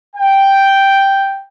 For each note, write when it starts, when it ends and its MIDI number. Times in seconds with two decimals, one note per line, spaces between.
0.16 1.42 79